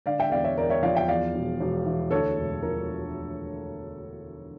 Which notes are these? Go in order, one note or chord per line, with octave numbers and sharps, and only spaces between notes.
D3 D5 F5
E5 G5
E2 D5 F5
C#5 E5
E2 A#4 D5
C#5 E5
F3 D5 F5
E5 G5
E2 D5 F5
E1
E1
E3
D2 A4 C#5
E1
F3 A#4